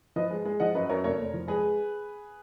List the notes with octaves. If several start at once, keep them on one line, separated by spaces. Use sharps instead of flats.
F3 B4 D#5
G#3
G#3
F3 D#5 F#5
F#2 B4 D#5
F#2 A#4 C#5
F1 A#4 C#5
F1
F3
G#3 G#4 B4